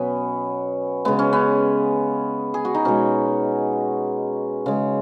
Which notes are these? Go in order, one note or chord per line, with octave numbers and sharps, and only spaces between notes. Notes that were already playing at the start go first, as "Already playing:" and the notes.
Already playing: B2 F#3 B3 C#4
C#3 G#3 B3
C#4
B3
G#4
F#4
D#4
B2 G#3 C#4
C#3 G#3